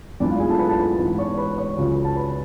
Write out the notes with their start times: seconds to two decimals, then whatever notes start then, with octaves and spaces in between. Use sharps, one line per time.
0.20 B1 A2 G#3 B3 D4 D5
0.30 F4 F5
0.40 G#4 G#5
0.49 A4 A5
0.59 B4 B5
0.69 A4 A5
0.79 B4 B5
0.99 A1 G#2 G#3 B3
1.18 C#5 C#6
1.38 B4 B5
1.57 C#5 C#6
1.77 C#2 C#3 F#3
2.05 A5
2.16 B4 B5